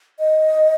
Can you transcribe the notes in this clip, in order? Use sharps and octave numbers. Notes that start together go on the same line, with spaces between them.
D#5